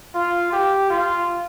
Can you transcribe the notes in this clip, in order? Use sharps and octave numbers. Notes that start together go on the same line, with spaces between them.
F4
G4
F4